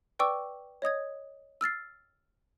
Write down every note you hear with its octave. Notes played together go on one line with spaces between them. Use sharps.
B4 D5 G5 C#6 D6 E6
C#5 D#5 D#6 G#6
E6 F6 A6 C7